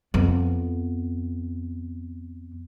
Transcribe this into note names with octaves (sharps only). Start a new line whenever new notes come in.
F2 B3